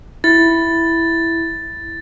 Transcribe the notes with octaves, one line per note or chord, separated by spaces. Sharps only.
E4 A6